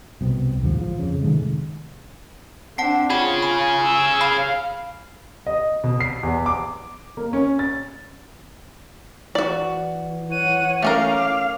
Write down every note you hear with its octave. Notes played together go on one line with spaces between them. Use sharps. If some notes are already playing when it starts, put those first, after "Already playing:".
C2 B2 C4
A#1 D#2 G#2 F3
F3
F2 C#3
C3 D#3 G#3 A3
C4 D4 F#5 A5 C7
F4 G#4 C#5 B5
B5
E6
F5 B5 C7
D#5
B2
C7
E2
D6
A#3
C#4
A6
E3 F#4 D5
C#5 F#5 D#7
A3 C#4 A#4 F5 D6